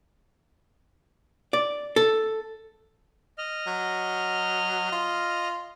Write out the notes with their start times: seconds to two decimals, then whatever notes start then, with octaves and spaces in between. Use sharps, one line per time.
1.53 D5
1.96 A4
3.38 D#5 F6
3.67 F#3
4.92 F4